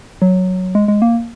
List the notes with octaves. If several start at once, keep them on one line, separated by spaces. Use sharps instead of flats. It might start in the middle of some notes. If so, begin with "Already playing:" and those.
F#3
G#3
G#3
A#3